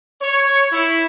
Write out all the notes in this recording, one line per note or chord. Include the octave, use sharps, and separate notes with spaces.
C#5
E4